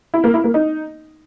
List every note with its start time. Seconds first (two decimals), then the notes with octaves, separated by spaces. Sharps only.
0.14 E4
0.24 A#3
0.34 E4
0.44 A#3
0.54 D#4